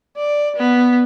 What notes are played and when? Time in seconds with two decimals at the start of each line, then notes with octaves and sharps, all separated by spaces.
0.17 D5
0.56 B3